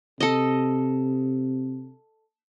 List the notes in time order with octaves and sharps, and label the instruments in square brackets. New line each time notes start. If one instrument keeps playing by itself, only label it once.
[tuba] C3 [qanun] A4 D#5